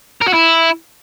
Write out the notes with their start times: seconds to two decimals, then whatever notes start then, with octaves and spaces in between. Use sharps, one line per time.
0.22 A#4
0.28 F#4
0.34 E4